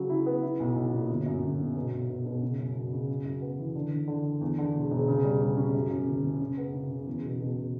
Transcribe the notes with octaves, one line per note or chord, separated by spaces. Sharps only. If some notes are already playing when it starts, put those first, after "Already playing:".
Already playing: C#3 F#3
E4
B3
E4
B1
B1
A#2
G1
F#2
G1
G1
B2
B1
B2
B2
C#3
F#2
F#2
C#3
F#2
F#2
B3
E3
D3
D3
D3
D3
E2
D3
E1
E1
C#3
G3
G3
C#4
F#2
F#2
F#1
F#1
C#3
B3
C#3
C#3
E2
B2
B2
B2